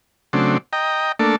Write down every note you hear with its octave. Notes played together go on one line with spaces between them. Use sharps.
C#3 F#3 A3 C4 D4
D#5 G5 A#5
A3 A#3 D4 A4